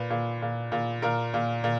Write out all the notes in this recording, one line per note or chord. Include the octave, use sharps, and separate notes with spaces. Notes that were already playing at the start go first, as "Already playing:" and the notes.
Already playing: A#2 B4
A#2
A#2
A#2
A#2 A#4
A#2
A#2